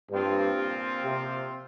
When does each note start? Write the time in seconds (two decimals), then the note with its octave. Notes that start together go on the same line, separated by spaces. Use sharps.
0.11 G2 A#2 F3 C4 F4
1.05 C3